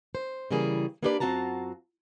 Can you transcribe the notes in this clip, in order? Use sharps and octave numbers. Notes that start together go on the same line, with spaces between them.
C5
C#3 E3 G3 A#3 G#4
A#3 B3 D4 G4 B4 D5
F#2 C4 F4 F#4 A5 A#5